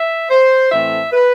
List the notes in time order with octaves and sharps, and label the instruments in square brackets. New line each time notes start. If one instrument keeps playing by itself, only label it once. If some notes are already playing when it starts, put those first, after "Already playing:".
Already playing: [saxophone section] E5
C5
A2 E3 A3 C4 E5
B4